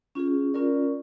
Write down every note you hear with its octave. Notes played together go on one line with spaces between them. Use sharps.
C#4 F4 G#4
C#4 F4 A#4 D5